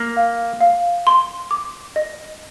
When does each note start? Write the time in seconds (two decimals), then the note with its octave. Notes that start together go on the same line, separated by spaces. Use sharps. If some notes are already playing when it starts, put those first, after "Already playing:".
Already playing: A#3
0.17 F5
0.61 F5
1.07 C6
1.51 D6
1.96 D#5